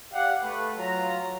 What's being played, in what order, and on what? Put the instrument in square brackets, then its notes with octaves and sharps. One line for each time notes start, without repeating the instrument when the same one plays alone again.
[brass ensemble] G4 D5 F5 F#5
A3 B4
F#3 F4 A#5